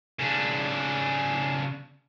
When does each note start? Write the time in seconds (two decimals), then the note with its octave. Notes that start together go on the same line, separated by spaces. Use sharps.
0.19 C#3 D4